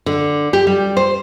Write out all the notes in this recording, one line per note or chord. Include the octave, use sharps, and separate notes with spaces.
D3
G4
G3
C5